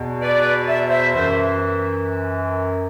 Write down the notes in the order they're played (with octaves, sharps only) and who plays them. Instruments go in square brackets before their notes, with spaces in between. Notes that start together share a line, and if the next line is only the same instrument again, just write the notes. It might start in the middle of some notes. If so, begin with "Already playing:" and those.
Already playing: [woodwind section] E2 B2
B4 D5
E5
C5 E5
F#2 E3 C5 E5